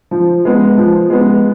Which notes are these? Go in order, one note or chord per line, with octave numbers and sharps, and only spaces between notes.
F3
G#3 B3
F3
G#3 B3